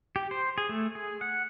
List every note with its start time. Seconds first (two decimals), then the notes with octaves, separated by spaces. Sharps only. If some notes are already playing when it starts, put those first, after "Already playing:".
0.16 G4
0.31 C5
0.58 G#4
0.69 A3
0.95 G#4
1.21 F#5